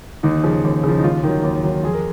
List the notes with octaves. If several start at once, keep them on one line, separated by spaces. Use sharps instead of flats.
D#2 D#4
C#3 F3
D#2
C#3 F3
D#4
D#2 F4
D#3 F#3
D#2
D#3 F#3
F2 G#4
A#4